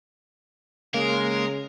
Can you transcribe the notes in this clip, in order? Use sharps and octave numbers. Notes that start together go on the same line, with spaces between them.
C#3 G#3 A#3 A#4